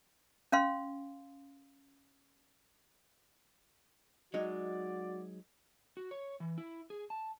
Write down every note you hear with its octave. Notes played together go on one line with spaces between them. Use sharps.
C#4 F5 C6
F#3 G#3 D#4 F#4 D5
F#4
C#5
E3
E4
G#4
A5